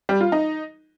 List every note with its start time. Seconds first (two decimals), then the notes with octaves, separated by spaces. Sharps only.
0.09 G3
0.21 F4
0.32 D#4